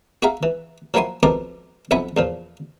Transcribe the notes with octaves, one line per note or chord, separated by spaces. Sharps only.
F#4 G#4 E5 F5 A#5
E3
F3 F#3 A#3 E4 G#5 C6
F2 B2 A#4 A5 C6 D6
B1 F2 E5 F#5 G#5 B5
E2 A#2 F3